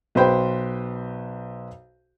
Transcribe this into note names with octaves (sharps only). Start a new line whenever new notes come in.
B1 B4 C5 G5